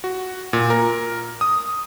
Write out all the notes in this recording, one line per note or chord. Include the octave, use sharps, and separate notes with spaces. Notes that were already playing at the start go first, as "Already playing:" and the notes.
F#4
A#2
A#4
D#6